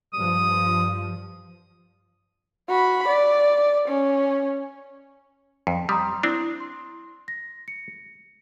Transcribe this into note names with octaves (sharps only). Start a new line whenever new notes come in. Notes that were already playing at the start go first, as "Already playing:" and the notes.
G2 F3 D#6
F#4 B5
D5
C#4
F2
G3 A#5 C6 D#6
C4 D4 E4
C6
A#6
C#7